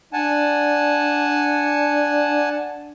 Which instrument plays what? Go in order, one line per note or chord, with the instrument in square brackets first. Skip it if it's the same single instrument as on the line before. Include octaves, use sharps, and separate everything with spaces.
[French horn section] D4 [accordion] F#5 G#5 A5